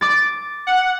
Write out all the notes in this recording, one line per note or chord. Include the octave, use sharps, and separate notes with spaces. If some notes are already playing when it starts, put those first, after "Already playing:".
D6 A6
F#5